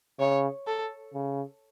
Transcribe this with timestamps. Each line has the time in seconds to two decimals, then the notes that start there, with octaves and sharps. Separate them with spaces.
0.20 C#3 C#5
0.67 A4
1.14 C#3